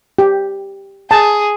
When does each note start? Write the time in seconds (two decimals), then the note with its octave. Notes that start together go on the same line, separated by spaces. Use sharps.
0.19 G4
1.11 G#4 A5